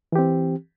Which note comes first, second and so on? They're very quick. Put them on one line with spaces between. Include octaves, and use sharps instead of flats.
E3 G4 C4